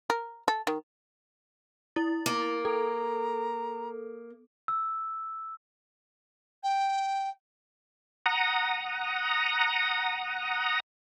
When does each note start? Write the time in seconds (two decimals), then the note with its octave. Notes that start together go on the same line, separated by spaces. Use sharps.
0.10 A#4
0.48 A4
0.67 D#3
1.96 E4 A6
2.26 A#3
2.65 A4 A#5
4.68 E6
6.63 G5
8.26 F#5 A#5 D#6